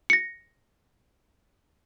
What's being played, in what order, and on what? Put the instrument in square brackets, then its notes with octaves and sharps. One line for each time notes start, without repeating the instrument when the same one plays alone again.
[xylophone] A#6 C#7